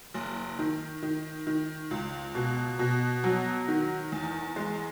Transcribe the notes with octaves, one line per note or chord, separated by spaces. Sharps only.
F#1
D#3
D#3
D#3
C#2
B2
B2
F#3
D#3
E2
G#3